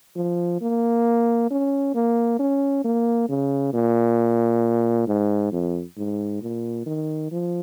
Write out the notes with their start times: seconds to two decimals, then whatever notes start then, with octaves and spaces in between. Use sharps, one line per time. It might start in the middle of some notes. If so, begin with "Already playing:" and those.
0.16 F3
0.61 A#3
1.50 C#4
1.95 A#3
2.39 C#4
2.84 A#3
3.29 C#3
3.73 A#2
5.07 G#2
5.52 F2
5.97 G#2
6.42 A#2
6.86 D#3
7.31 F3